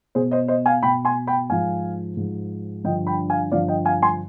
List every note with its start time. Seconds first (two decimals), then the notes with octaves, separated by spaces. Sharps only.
0.15 B2 G#4 C5
0.31 C5 D#5
0.48 C5 D#5
0.66 F5 G#5
0.83 B2 G5 B5
1.05 G#5 C6
1.27 G5 B5
1.50 G#2 F3 F5 G#5
2.17 G#2 F3
2.84 G2 D3 F3 D#5 G5
3.07 G5 B5
3.30 F5 G#5
3.52 G2 D3 F3 D5 F5
3.68 D#5 G5
3.85 F5 G#5
4.02 G#5 C6